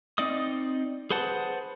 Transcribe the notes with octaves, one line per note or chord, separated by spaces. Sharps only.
C4 D#4 D5 D#5 D#6
G#4 B4 C5 F#5 A5